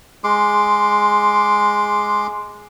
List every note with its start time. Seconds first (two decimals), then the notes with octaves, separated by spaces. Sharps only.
0.24 G#3 C6 D6